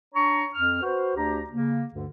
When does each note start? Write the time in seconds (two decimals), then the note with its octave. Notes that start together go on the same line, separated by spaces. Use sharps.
0.15 D4 C#5 A#5 C#6
0.54 F2 F6
0.82 F#4 B4 C5
1.16 D2 D4 G4 A#5
1.51 C#3 A#3
1.94 D2 G2 D3